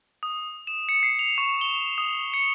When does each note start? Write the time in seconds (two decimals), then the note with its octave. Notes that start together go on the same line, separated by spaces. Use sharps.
0.23 D#6
0.67 E7
0.89 C#7
1.03 C7
1.19 F7
1.38 C#6
1.61 G7
1.98 D#6
2.34 C#7